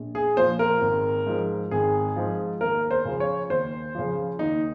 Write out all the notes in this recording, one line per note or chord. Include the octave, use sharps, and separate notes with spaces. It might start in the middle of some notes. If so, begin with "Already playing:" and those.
Already playing: A#1
G#4
A#2 F3 C5
A#4
G#1
G#2 F3
G#1 G#4
G#2 F3
D#2 A#4
C5
C#3 F3
C#5
D#2 C5
C#3 F3
D#2 D#4